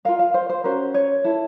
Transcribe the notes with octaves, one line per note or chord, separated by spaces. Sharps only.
F4 A#4 F5
F5
C5
C5
C#4 F#4 A#4 C5
C#5
E4 A4